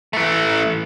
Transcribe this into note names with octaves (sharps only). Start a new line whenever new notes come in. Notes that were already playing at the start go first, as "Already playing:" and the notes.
E3 A3